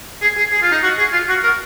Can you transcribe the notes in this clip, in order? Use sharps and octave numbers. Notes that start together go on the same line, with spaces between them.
G#4
G#4
G#4
F4
D#4
F#4
G#4
F4
F#4
A#4